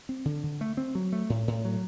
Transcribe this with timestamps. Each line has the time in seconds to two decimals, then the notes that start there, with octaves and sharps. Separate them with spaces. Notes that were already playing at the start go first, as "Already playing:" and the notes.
0.09 C4
0.25 D3
0.43 D3
0.61 A3
0.77 C4
0.95 F#3
1.12 A3
1.30 A2
1.48 A2
1.65 F#3